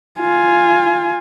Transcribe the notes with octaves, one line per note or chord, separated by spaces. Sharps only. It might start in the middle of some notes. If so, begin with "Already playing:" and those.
F4 G#5